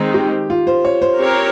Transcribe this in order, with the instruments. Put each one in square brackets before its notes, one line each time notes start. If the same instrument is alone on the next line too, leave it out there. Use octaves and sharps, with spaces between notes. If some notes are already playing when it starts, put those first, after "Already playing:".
Already playing: [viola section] D#3 G#3 C4 D#4
[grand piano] G4
F4
C5
C#5
C5
[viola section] C4 G4 A#4 C#5